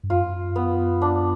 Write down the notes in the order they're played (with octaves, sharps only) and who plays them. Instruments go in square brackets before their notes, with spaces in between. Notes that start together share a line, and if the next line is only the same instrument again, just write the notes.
[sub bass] G2
[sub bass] F#2 [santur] F4
[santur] B3
D4